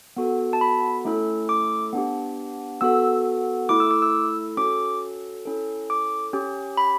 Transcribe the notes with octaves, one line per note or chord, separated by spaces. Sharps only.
B3 F#4 A4
A5
B5
A3 C#4 E4 A4
D6
B3 D4 G4
B3 F#4 A4 E6
A3 E4 A4 D6
E6
D6
E6
C#4 F#4 A4 D6
C#4 E4 A4
D6
C#4 G4
B5